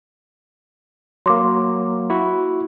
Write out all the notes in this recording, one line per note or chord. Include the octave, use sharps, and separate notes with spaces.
F#3 A#3 C6 D6
E4 F#4